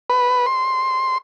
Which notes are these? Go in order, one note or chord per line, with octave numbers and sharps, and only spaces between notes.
B4
C6